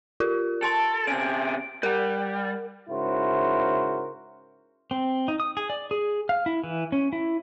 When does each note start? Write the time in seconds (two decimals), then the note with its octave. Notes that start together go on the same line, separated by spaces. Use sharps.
0.20 F4 G4 A#4
0.63 A4 A5 C6 D7
1.07 C3 C#4 D7
1.83 G3 A#4 F#5
2.90 G#2 C#3 E4 F#4 A#4 C5
4.91 C4
5.28 D#4
5.40 D#6
5.57 G#4
5.70 D5
5.91 G#4
6.29 F5
6.46 E4
6.64 E3
6.92 C#4
7.13 E4